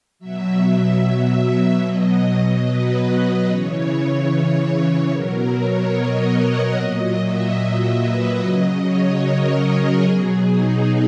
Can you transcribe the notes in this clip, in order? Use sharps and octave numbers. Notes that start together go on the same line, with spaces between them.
B2 F#3 E5
E5
E5
E5
B2 F#3 D#5
B4
D#5
C#3 E3 C#5
C#5
B2 F#3 A#4
C#5
D#5
F#5
A#2 F#3 D#5
E5
D#5
B4
C#3 F#3 D#5
C#5
A#4
G#4
B2 F#3
D#4